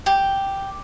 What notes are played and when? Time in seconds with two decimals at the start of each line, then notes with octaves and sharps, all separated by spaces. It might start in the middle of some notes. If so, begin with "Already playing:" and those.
0.06 G4